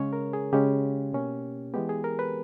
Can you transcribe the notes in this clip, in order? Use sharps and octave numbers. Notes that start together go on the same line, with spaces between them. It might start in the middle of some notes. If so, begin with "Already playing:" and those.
Already playing: C#3 G#3 C#4 C#5
A#4
G#4
C#3 G#3 C#4 G4
B2 A#3 C#4
E3 G#3 B3 G4
G#4
A#4
B4